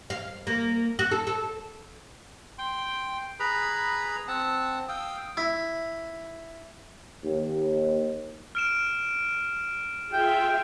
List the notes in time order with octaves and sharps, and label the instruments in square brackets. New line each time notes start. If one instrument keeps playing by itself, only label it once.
[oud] F5
A#3
F#4
A4
A4
[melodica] G5 C6
G#4 B4 A#5 B5
C4 F#5 A5
F5 G5 D#6 E6
[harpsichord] E4
[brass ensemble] D#2
[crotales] F6 D7 E7
[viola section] F4 G#4 E5 [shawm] G5